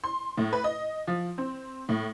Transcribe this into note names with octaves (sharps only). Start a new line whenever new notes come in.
C6
A2
B4
D#5
F3
C4
A2